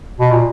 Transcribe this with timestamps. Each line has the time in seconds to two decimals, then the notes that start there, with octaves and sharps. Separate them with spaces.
0.20 B2
0.32 A#2